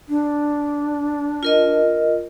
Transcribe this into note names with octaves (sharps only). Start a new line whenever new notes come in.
D4
F4 A#4 D#5